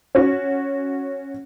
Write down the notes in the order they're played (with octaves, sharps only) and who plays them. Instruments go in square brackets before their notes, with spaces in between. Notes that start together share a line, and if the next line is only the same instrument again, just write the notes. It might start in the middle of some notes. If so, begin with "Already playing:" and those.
[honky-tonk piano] C#4 F#4